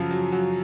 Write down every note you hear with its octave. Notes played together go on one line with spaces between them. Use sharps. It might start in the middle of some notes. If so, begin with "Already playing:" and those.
Already playing: F#2 C#3 F3 F#3
F#3
F#3